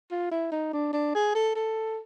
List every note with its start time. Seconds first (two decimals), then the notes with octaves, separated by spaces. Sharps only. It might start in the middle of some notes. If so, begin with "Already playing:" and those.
0.11 F4
0.31 E4
0.51 D#4
0.73 D4
0.93 D4
1.14 G#4
1.35 A4
1.56 A4